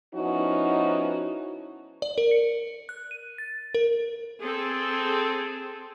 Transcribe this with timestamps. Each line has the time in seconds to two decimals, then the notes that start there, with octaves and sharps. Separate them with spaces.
0.15 F3 B3 C#4 D#4 E4 F#4
2.02 D5
2.18 A#4
2.31 C#7
2.89 F#6
3.11 D#7
3.38 A6
3.75 A#4
4.43 C4 G#4 A4